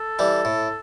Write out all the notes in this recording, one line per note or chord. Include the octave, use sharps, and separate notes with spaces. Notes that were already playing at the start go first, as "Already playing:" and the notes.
Already playing: A4
E3 G3
A2